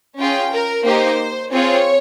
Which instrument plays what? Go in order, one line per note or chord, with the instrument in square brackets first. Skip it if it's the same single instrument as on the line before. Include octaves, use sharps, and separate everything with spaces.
[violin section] C#4 F4 G#4 G5
A#4
A#3 D#4 G4 C5
C4 F4 G#4 C#5